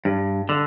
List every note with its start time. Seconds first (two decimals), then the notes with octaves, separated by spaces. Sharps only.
0.05 G2
0.49 D3